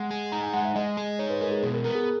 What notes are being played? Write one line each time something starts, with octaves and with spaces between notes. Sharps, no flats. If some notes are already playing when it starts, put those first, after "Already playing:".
Already playing: G#3 F#5
G#4
D#4 A#5
G#5
G#3 F#5
E5
G#3 D#5
G#4
D#4 C#5
B4
G#3 A#4
G#4
B2 G#4
A#4
B3 A#4
G#4